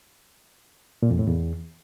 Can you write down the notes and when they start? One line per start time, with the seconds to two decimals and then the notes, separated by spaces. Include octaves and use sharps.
1.03 A#2
1.11 F2
1.19 A2
1.27 E2